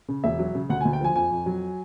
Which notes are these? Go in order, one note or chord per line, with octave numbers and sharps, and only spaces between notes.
C#3
E1 E5
F#3
C#3
D2 F#5
G#5
D2
G5
F3 G#5
F2 G#5
F2
F#3